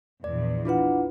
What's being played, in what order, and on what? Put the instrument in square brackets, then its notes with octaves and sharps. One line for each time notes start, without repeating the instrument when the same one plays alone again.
[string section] A#1 E2 [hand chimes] D5
[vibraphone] D4 F#5 [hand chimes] E4 F4 B4